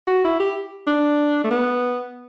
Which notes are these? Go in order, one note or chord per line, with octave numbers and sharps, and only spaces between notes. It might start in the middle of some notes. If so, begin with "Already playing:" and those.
F#4
E4
G4
D4
A3
B3